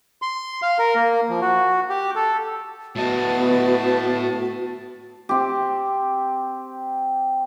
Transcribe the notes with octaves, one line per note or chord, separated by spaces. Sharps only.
C6
F5
A#4
A#3
F3
F#4
G4
A4
A2 B3 F#4 D#5 A5
C4 G4